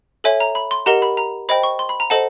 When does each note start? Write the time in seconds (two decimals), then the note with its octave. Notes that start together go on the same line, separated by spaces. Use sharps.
0.24 A4 C#5 E5 G#5
0.40 A#5
0.55 B5
0.71 C6
0.86 G4 A#4 D#5 F#5 A#5
1.02 B5
1.17 A#5
1.49 C5 D#5 G5 B5
1.63 C#6
1.79 C6
1.89 B5
2.00 A#5
2.10 A4 C5 D#5 F#5 A5